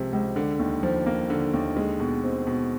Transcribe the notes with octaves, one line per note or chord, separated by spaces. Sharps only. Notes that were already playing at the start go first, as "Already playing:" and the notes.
Already playing: C#2 C3 F3
C#2
D3
D#2
F3
A#3
D3
D#2
G#3
B2
C4
B2